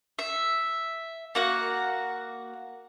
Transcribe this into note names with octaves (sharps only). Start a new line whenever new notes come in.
E5
A#3 F#4 F#5